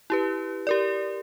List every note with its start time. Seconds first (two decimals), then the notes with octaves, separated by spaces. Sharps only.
0.10 E4 G4 B4
0.67 G4 A#4 D5